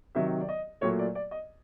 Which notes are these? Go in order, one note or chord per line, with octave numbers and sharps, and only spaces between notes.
C3 D#3 F#3 E5
D5
D#5
A#2 F#3 A3 C#5
D5
D5
D#5